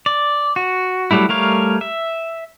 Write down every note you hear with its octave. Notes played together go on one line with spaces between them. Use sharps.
D5
F#4
F#3 G3 A3 E4
G3 A3 A#4 C#5 F5
E5